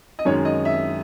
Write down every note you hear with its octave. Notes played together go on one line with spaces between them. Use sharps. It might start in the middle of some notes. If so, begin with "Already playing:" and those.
D#5
F#2 D#3 G#3 C#4 C#5
D#5
E5